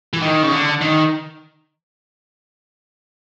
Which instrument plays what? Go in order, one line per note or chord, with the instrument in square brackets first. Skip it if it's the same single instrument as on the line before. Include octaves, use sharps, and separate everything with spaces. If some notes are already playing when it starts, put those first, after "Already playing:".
[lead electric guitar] E3
D#3
C#3
D3
D#3